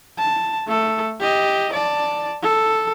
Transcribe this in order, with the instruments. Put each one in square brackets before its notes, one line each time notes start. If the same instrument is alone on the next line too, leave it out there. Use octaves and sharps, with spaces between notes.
[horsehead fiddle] A5
A3 A4
G4 D#5
D5 A5
A4